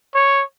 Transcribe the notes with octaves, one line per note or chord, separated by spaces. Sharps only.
C#5